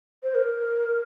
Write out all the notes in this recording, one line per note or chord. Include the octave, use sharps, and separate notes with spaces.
C5
A#4